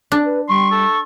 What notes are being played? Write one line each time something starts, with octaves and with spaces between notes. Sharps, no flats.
C#4 D4
B4
G3 C6 C#6
A4